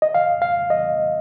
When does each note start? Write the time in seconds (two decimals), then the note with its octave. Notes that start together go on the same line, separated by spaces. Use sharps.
0.02 D#5
0.14 F5
0.42 F5
0.70 D#5